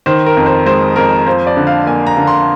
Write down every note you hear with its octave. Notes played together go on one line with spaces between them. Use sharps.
D#3 C5
A#4
F2
C5
G#3 C5
F2 A#4
F3 C5
D5
D3
F5
A#3 G#5
A#5
D3
C6